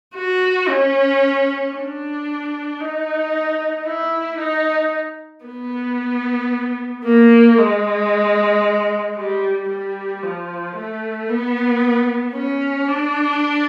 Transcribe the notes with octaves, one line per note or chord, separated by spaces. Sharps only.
F#4
C#4
D4
D#4
E4
D#4
B3
A#3
G#3
G3
G3
F3
A3
B3
C#4
D4